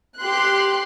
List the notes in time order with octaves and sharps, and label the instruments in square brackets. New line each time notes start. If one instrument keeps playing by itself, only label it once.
[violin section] G4 C6 F#6